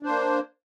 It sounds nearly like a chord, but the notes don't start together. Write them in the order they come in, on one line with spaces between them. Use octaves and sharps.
D4 C5 A#3